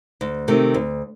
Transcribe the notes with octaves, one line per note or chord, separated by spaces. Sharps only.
D2
C3 D#3 A3
D2